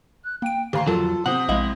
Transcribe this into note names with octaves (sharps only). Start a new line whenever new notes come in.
F#6
A#3 G5 D7
D2 G4 F5 A#5 C6
F2 F#3 F4 A4
C3 B3 C5 F#5 A5 D#6
A#1 G#3 E4 D#5 F5